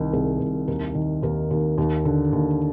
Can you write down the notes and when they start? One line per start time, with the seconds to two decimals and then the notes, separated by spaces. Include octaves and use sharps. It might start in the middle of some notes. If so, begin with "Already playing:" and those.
Already playing: C2 D#3
0.13 C2 G#4
0.40 C2
0.68 D#2 A#4
0.95 D#3
1.23 D#2 A#4
1.51 D#2
1.78 D#2
2.05 D3
2.33 D#2